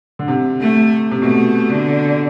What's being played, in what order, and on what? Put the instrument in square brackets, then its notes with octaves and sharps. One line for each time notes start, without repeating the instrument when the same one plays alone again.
[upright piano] D3
C3
[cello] A3
[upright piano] C3
[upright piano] B2 [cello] A3
[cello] D3